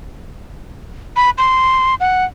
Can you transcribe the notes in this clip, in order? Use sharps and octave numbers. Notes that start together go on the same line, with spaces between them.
B5
C6
F#5